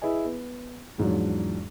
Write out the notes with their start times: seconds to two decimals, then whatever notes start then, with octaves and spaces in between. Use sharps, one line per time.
0.02 E4 G#4 B4 D#5 G#5
0.25 B3
0.98 E2 G#2 F3 F#3 D4